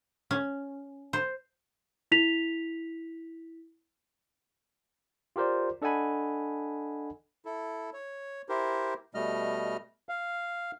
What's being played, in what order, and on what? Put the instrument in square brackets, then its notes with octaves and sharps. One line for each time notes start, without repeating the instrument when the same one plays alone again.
[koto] C#4
C5
[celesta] E4 B6 F7
[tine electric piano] F4 G4 A#4 C5 D5
D4 A4 D#5 F#5 G#5 B5
[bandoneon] E4 A4
C#5
E4 G4 A#4 C5
B2 G3 A3 D#5 F6
F5